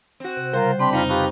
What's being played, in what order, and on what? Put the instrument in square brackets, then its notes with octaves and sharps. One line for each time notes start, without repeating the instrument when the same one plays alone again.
[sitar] C4 F#4
[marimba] C3
[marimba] C#3 G3 [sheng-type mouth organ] F4 [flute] A#4 [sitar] C5
[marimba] C4 [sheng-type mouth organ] D4 G4 B5 [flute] C6
[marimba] F2 C5 F6 [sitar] D#4 [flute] F4
[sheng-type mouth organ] F4 B4 D#6 [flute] G4 [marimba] A5 B5 C#6